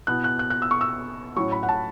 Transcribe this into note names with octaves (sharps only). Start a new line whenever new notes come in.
B2 B3 E4 F#6
F#6
F#6
F#6
E6
C#6
E6
A2 F#3 C#4 E4 C#6
B5
F#5
A5